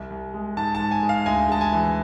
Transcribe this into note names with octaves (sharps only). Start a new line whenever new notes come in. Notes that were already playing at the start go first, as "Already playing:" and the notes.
Already playing: C2
C2
G#3
G#2 A5
A5
G#2
G#5
G#3
F5
D2 G#5
G#3 A5
G#5
E3